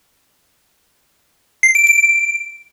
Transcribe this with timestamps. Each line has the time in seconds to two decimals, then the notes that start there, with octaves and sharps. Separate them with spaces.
1.63 C7
1.75 D7
1.87 D7